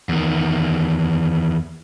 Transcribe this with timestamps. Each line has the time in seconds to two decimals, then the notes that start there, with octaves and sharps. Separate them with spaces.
0.09 E2 D#3